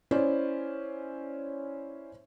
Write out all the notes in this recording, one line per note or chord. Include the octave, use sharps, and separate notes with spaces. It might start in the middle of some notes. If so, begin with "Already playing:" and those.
C#4 E4 C5 D5